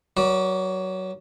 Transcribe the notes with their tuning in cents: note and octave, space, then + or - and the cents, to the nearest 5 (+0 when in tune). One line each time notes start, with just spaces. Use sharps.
F#3 +15 B4 -40 D5 +0